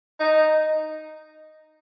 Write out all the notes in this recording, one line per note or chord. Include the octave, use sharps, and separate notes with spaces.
D#4